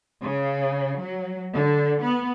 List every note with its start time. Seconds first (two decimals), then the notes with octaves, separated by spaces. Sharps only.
0.22 C#3
1.00 F#3
1.53 D3
2.01 B3